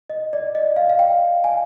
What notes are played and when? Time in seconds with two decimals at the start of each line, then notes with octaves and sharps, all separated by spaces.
0.10 D#5
0.33 D5
0.55 D#5
0.76 F5
0.89 F5
0.99 G5
1.44 G#5